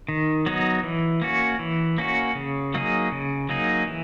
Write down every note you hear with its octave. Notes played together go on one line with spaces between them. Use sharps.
D#3
F#3 B3 D#4
E3
A#3 C#4 F#4
E3
A#3 C#4 F#4
C#3
F#3 A#3 D#4 G#4
C#3
F#3 A#3 D#4 G#4
E3